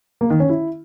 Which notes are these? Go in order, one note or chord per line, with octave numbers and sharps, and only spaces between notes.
A#3
D#3
C#4
E4